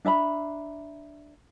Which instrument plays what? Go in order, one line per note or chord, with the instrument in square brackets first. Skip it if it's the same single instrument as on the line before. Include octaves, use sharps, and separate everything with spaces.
[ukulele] D4 E5 A#5 B5